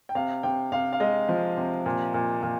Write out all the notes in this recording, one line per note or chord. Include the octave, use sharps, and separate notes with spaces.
G5
C3 F5
C3 G5
C3 F5
F5
G#3 D#5
F3
C3
A#2
A#2
A#2